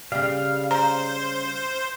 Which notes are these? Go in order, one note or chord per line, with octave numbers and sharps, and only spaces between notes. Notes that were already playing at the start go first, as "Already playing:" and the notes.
C#3 G3 F5
C5 A#5